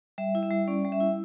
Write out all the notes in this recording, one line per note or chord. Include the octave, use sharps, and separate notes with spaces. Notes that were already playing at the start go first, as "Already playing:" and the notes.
G3 E5
E4
E5
G3
C#4 D5
G3
E5
E4